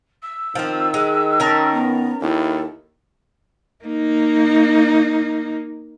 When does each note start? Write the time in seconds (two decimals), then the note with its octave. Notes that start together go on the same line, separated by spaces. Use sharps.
0.22 E6
0.55 D#3 F3 C4
0.94 G#3
1.40 C#4 A#4 A5
1.73 B3 A#5
2.21 D#2 E4 A4
3.84 A#3 D#4